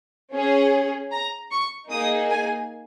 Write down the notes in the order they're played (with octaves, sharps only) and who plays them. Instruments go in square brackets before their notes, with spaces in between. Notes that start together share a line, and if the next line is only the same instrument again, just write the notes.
[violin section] C#4 G#4
A#5
C#6
A#3 D#4 G#4 D#6
G#5